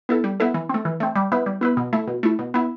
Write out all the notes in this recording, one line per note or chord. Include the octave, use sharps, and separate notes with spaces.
B3 E4 A4
G3
B3 E4 A4
E3
A3 C4
E3
A3 C4
G3
B3 E4 B4
G3
B3 E4 B4
B2
A3 E4
B2
A3 E4
B2
B3 E4